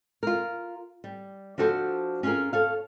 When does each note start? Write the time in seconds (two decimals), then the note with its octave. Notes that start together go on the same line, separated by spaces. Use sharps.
0.23 F4 A#4
1.04 G3
1.58 F3 D4 F#4 A4 C5
2.23 C#4 F4 F#4 G#4 A#4
2.53 A4 C#5 F5